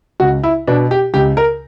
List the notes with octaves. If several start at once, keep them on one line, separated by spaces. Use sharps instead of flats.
C#2 F#4
E4
B2 D4
G4
C#2 G4
A#4